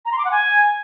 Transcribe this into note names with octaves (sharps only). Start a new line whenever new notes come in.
A#5
C6
D6
F#5
G#5